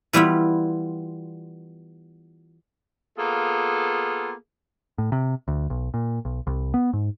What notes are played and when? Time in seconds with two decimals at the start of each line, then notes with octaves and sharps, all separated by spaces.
0.13 E3 G3 B3 E4 F4
3.18 A#3 B3 F4 G#4 A4
4.98 A2
5.12 C3
5.48 D2
5.70 B1
5.94 A#2
6.25 B1
6.47 C2
6.74 B3
6.93 G#2